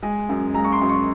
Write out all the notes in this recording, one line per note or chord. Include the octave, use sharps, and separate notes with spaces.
G#3 G#5
F#2
G#3 A#5
C#6
C6
F#2
C#6